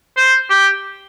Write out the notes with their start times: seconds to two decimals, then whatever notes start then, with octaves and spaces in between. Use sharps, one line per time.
0.17 C5
0.50 G4